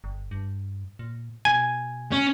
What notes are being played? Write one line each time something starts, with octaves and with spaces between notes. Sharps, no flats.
G1
G2
A#2
B2 G#5
C#4